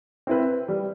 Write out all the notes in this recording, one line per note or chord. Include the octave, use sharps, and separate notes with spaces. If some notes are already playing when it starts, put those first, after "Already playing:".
C4 E4 B4
G3